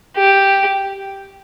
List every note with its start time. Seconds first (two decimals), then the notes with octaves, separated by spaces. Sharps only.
0.17 G4